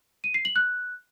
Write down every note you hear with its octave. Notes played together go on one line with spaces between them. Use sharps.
D#7
C7
F#7
F#6